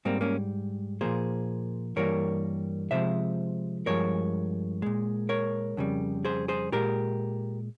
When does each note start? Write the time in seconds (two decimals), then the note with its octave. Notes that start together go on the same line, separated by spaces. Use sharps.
0.05 G#2 G3 A#3 C4
0.21 A#3 C#4
1.01 A#2 F3 A#3 G#4 C5
1.96 G2 E3 G3 A#3 A#4 C#5
2.91 C3 F3 G#3 C5 E5
3.86 G2 F3 G#3 A#4 C#5
4.82 A#2 G#3
5.29 A#4 C#5
5.77 F2 C#3 G3
6.25 G#4 C5
6.48 G#4 C5
6.72 A#2 G#3 G4 A#4